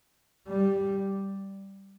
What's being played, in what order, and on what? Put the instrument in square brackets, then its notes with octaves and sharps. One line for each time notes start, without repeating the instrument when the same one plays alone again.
[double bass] G3